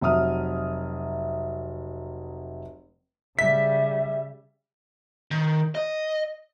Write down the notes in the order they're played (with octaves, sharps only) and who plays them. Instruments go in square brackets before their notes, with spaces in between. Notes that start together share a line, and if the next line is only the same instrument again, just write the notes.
[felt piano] F1 F#3 E5 D#6 F6
[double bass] C#3 G3 [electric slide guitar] E5 [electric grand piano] B6
[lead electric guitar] D#3
D#5